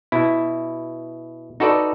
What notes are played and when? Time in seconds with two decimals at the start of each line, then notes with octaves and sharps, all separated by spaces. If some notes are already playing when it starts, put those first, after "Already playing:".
0.12 B2 E4
1.60 D#4 F#4 A4 B4 D5